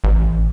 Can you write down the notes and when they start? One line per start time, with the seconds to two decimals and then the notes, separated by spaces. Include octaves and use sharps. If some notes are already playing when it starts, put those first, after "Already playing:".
0.04 A1